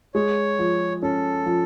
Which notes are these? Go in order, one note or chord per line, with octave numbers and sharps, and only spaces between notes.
G#3 C#5
F3
C#4 A4
F3